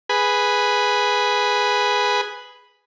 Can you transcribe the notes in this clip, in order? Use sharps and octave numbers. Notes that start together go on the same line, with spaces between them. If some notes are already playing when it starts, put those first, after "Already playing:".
G#4 B4